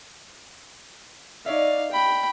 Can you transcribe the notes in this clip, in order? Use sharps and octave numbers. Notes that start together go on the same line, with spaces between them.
D#4 C#5 D5 E5 F5
G5 B5